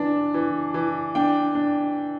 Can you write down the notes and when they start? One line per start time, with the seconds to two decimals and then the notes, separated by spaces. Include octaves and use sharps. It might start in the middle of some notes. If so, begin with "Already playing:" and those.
Already playing: E3 D4 A5
0.34 E3
0.74 E3
1.15 D4 G5
1.55 D4